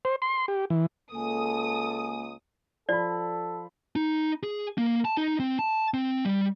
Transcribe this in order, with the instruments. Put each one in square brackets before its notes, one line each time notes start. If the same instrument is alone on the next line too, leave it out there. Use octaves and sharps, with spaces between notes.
[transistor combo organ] C5
C6
G4
E3
[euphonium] C#2 [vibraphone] A#3 G#5 [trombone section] A4 [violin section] D#6
[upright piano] F3 B5 [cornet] A4 [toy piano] D5
[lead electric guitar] D#4
G#4
A#3
A5
D#4
C4
A5
C4
G3